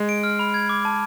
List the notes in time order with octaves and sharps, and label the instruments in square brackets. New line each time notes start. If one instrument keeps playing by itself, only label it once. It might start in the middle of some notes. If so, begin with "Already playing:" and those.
Already playing: [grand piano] G#3
[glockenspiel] D7
F6
B5
G#6
D6
A5